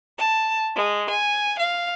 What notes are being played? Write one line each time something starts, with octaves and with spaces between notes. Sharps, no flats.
A5
G#3
G#5
F5